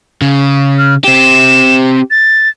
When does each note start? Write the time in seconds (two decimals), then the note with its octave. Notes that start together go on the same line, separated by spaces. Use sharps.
0.22 C#3
0.79 F6
1.04 C4 G4 E7
2.11 A6